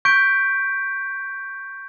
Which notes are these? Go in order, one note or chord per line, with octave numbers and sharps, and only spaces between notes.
C#6 G6 B6 D7